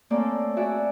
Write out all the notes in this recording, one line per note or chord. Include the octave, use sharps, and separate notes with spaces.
A3 A#3 C4 C#4 A4 D5
F#4 G#4 D5 E5